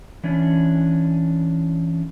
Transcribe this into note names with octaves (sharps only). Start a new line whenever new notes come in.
E3 C#4 D4